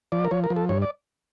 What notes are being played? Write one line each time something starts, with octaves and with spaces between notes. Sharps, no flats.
F3 D5
A#4
F3 C#5
A#4
F3
A4
G2 C#5
D5